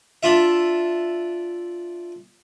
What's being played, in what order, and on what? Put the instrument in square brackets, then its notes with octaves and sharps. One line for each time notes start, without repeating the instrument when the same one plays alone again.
[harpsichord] D4 F4 E5